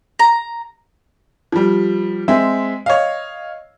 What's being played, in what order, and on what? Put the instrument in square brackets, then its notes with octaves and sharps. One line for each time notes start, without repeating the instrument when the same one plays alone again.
[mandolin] A#5
[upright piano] F3 G3
G#3 C4 E5
C#5 D#5 F5